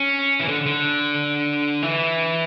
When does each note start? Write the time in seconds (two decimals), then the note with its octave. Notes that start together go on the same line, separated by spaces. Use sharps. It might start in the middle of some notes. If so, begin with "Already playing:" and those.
Already playing: C#4
0.40 E3
0.48 D3
0.66 D3
1.82 E3